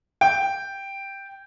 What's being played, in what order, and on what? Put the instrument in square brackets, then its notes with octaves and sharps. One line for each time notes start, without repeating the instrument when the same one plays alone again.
[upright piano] G5